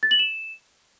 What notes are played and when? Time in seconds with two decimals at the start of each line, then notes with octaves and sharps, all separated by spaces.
0.03 A6
0.11 F#7
0.19 E7